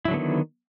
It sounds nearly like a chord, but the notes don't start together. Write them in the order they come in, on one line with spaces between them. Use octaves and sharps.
E4 F#3 D3 B3 D#3